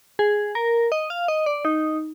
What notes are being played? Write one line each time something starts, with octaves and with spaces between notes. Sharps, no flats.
G#4
A#4
D#5
F5
D#5
D5
D#4